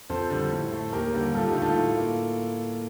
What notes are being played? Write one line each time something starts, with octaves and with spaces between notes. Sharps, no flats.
F2 A4 C5
D3 G3
A2
A3
D#2 G4 A#4
D3 G3 A#3
G2 F4 A4
D#4 G4
D3 A3
F4 A4
A2
A#3